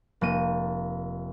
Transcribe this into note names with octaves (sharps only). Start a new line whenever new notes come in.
F1 A#3 D#7